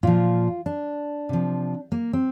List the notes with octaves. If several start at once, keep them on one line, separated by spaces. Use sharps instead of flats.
A#2 F3 F4
D4
C3 F3
A#3
C4